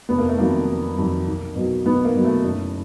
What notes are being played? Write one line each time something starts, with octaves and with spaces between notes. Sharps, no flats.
F1 B3
A#3
A3
F2 C3 D#3 F#3 A#3
F1
F2 C3 D#3 F#3
B1
B2 F#3
B1 B3
A#3
B2 F#3
A3
F#1